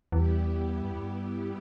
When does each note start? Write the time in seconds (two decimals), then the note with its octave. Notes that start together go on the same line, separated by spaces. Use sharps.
0.12 E2 G3 B3 E4 G4
0.81 G2
0.90 E2
0.99 G2